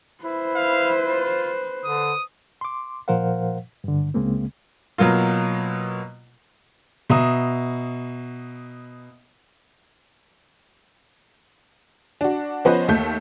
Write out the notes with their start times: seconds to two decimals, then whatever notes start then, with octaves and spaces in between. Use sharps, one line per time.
0.24 E4 B4 C5
0.55 F5
1.05 F4
1.85 D3 D#6
2.61 C6 D6
3.08 A#2 F3 A#4 C5 F5 F#5
3.84 G2 D3
4.14 C#2 C#3 G#3 A#3 C4
4.98 B2 F#3 A#3 F4
7.10 B2 E5 A#5 D#6
12.21 D4 F#4
12.65 F3 B3 C#4 B4 C5 D#5
12.88 D#2 A3 G6